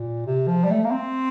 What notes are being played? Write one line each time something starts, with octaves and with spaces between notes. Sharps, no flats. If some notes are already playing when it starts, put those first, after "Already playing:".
Already playing: A#2
C3
F3
G3
A3
A#3
C4